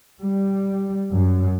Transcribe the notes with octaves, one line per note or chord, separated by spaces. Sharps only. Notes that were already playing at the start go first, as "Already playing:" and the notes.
G3
F#2